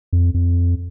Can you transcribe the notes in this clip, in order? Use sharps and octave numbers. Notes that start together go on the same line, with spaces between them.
F2
F2